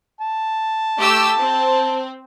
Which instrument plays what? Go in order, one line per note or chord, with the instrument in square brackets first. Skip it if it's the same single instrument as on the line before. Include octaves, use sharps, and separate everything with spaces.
[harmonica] A5
[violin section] A3 G4 E6
C4